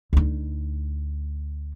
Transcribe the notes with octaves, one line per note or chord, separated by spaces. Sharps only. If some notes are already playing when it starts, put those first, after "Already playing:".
D2 D#4